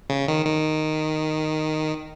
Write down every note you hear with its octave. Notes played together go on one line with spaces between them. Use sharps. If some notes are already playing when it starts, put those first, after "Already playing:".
C#3
D#3
D#3